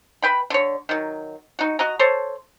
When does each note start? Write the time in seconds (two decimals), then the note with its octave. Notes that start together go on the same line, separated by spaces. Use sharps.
0.22 B4 G5 B5
0.50 D3 C#5
0.89 D#3 F#3
1.59 D#4 F#4
1.79 F#4 D#5 A#5
1.99 A4 C5 C#5